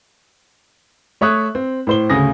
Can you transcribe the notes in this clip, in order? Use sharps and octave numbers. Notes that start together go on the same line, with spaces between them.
A3 C#5 E5 D#6 F#6
C4
A2 C5 G7
D2 C#3 G#5 D#6 A#6